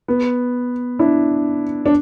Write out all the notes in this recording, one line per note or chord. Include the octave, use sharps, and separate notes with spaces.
B3
D4 E4
D4